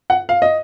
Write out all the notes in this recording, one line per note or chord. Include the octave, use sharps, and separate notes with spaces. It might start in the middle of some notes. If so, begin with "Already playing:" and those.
F#5
F5
D#5